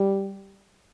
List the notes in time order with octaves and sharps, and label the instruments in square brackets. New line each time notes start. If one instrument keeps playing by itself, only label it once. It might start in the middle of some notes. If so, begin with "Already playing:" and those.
Already playing: [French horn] G3